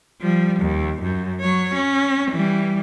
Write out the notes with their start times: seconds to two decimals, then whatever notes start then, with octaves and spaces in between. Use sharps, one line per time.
0.21 F3 G3
0.60 D#2
1.02 F#2
1.41 F#3 C#5
1.74 C#4
2.31 E3 G3